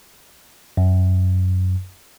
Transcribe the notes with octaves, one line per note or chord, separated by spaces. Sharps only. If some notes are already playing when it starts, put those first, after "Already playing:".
F#2